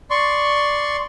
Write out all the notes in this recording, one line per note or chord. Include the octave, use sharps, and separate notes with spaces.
D5 C6 C#6